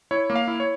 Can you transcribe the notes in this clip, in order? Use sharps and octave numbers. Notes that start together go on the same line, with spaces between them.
E4 C#5
A#3
F5
E4
C#5